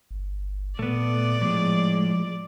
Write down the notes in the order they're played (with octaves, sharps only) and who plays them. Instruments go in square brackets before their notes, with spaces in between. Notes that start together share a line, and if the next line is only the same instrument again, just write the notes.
[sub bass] G1
[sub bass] A#2 [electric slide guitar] A3 B3 [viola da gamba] D5
[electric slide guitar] A2 G#3 [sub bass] F3